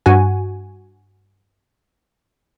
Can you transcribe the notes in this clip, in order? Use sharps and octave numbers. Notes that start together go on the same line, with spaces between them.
G2 F#4 F#5 G#5